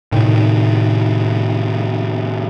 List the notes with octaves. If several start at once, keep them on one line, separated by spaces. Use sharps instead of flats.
A2 C3 D#3